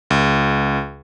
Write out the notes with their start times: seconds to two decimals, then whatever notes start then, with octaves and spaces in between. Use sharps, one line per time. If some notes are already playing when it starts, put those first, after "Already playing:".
0.10 C#2